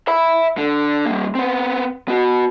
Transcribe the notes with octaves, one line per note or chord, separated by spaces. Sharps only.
E5 B5
D3
G3 A#3
B3 C4
B3 F#4